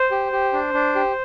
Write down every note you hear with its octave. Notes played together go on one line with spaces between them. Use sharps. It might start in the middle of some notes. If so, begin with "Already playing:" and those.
Already playing: C5
G4
G4
D4
D4
G4